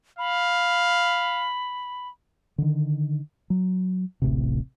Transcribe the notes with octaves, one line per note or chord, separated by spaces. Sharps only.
F5 B5
D3 D#3
F#3
D1 A1 A2 C3